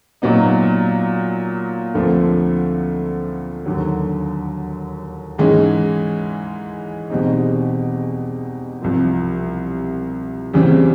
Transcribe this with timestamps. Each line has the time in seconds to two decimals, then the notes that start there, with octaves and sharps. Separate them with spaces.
0.22 A#2 F#3 B3 D#4
1.95 D2 D3 F3 A3 C4
3.65 D#2 D3 F#3
5.39 G#2 E3 G#3 C#4
7.10 E2 B2 G3 C4 D#4
8.82 C2 C3 F3
10.54 E2 C#3 E3 G3 C4